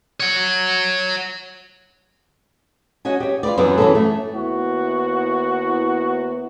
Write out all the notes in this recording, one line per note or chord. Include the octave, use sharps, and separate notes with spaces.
C#5 F#5
C#4 F#4 D#5 G#5
G4 C#5
F4 G4 B4 D5
F#2 E3 F#3 B3 C#4
E3 F#3 A#3 B3 C#4 A4
A3
D#2 B3 E4 F#4